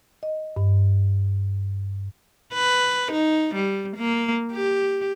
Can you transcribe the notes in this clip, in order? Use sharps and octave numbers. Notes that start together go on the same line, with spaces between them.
D#5
G2
B4
D#4
G3
A#3
G4